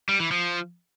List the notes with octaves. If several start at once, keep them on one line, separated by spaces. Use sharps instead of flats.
G3
E3
F3